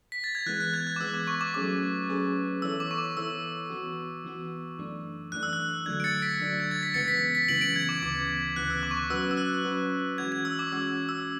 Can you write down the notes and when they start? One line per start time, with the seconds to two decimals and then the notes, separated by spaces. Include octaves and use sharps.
0.12 B6
0.24 A6
0.35 G#6
0.46 E3 G#3 B3 F#6
0.60 F#6
0.74 G#6
0.87 F#6
0.96 D6
1.00 E3 G#3 B3 E6
1.14 D6
1.27 C#6
1.41 D6
1.54 F#3 A3 C#4 G#4 B4 D6
2.09 F#3 A3 C#4 G#4 B4
2.62 E3 B3 E4 A4 C#5 E6
2.80 D6
2.91 C#6
2.98 D6
3.17 E3 B3 E4 A4 C#5 E6
3.70 E3 B3 F#4
4.24 E3 B3 F#4
4.78 F#2 E3 A3 D4
5.32 F#2 E3 A3 D4 F#6
5.43 E6
5.53 F#6
5.86 D3 F#3 A3 D4 G#6
6.00 D7
6.04 A6 C#7
6.22 B6 D7
6.40 D3 F#3 A3 D4
6.60 G#6
6.71 A6
6.83 B6
6.94 F#2 C#3 E3 G#3 B3 A6 C#7
7.08 B6
7.35 B6
7.48 F#2 C#3 E3 G#3 B3 D7 F#7
7.61 D7 F#7
7.76 G#6
7.89 D6
8.02 D2 C#3 E3 B3 D6
8.56 D2 C#3 E3 B3 F#6
8.70 E6
8.83 D6
8.91 C#6
8.97 D6
9.10 F#3 C#4 F#4 B4 E6
9.31 E6
9.37 F#6
9.65 F#3 C#4 F#4 B4
10.18 E3 G#3 C#4 F#4 G#6
10.32 G#6
10.45 E6
10.59 D6
10.72 E3 G#3 C#4 F#4 E6
11.09 E6